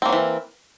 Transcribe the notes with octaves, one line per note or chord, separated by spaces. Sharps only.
E3 F#3 A#3 C4